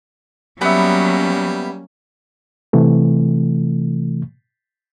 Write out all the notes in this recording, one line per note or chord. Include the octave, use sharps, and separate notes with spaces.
F#3 G3 A#3 B3 C#4 E5
C3 E3 A3